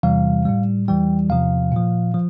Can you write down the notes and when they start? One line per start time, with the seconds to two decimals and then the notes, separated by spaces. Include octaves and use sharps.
0.03 E2 C3 E3 G3 F5
0.45 A2 G3
0.88 E2 E3 G3 G5
1.29 E2 C3 F3 F5
1.72 A#2 F3
2.14 F3